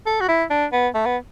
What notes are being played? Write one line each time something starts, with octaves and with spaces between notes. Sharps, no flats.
A4
F#4
E4
D4
B3
A3
B3